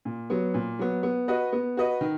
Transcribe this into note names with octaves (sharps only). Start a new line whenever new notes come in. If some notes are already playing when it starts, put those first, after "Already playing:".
A#2
F#3 B3
A#2
F#3 B3
B3
F#4 B4 D#5
B3
F#4 B4 D#5
D#3